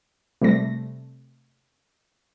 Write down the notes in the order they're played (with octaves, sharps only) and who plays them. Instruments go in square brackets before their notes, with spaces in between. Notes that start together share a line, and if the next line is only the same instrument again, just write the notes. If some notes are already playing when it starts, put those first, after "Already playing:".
[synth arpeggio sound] C3 G3 A3 A#6